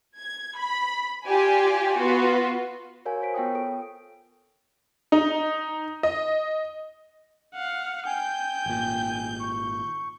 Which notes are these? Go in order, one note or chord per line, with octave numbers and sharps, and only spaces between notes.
G#6
B5
F4 G4 D5 G#5
B3 F4 F#4 B4
F#4 A#4 C#5 F5 G#5
A#4 C5 B6 D7
B3 F4 C#5 G5 D#6
A4 G5 D#6 D7
D#4
D#5
F5 F#5
G5 G#5 G6
G#1 A#2
C#6